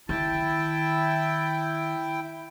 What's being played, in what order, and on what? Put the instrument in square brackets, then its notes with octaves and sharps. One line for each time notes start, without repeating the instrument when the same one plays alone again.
[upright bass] D#3 [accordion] E4 G5 [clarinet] A5